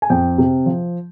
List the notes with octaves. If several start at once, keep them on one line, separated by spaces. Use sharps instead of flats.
G#5
F2 G5
C3
F3